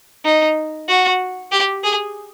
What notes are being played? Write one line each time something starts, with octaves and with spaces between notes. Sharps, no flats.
D#4
F#4
G4
G#4